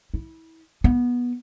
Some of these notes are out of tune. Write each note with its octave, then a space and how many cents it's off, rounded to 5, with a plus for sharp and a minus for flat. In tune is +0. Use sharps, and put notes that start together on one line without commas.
E4 -25
B3 -20